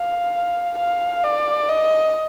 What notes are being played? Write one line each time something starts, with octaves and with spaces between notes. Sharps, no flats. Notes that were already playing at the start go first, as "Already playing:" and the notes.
Already playing: F5
F5
D5
D#5